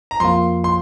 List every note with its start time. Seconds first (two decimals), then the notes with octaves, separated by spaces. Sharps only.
0.11 A#5
0.20 F2 F3 A#3 F4 C6
0.64 C6